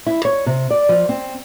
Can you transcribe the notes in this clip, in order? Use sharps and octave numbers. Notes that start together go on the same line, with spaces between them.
E4
C#5
C3
D5
F3
C4